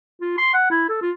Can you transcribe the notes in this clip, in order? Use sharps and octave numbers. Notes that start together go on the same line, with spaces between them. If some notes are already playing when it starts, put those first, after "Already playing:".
F4
C6
F#5
E4
A4
F4